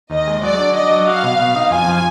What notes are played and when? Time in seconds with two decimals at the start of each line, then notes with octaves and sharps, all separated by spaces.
0.10 D#2 D#5
0.27 G#3
0.42 F#3 D5
0.58 D4
0.74 D4 D#5
0.91 F#3
1.07 F#4 F5
1.23 B2
1.39 B2
1.56 D#4
1.71 F2 G#5
1.88 F3